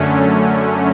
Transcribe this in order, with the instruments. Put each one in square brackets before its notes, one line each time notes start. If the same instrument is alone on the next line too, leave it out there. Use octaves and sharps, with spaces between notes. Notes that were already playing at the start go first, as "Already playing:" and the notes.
Already playing: [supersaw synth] F#2 D3 F#3 A3 C#4